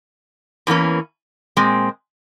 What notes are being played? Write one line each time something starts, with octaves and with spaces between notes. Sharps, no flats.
E2 E3 A#3 C#4
A#2 G#3 C4